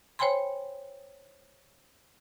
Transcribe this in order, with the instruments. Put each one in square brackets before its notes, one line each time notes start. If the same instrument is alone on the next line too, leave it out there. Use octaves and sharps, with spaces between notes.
[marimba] C5 C#5 G5 G#5 B5 C6